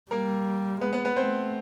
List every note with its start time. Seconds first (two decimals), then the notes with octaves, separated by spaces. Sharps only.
0.11 G3 A#3 A#4
0.81 G#3 B3 B4
0.93 B3 B4
1.05 B3 B4
1.16 A3 C4 C5